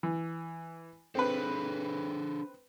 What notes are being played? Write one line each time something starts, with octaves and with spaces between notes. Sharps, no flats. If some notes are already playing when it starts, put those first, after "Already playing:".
E3
C4 D4 G#4 A4 B4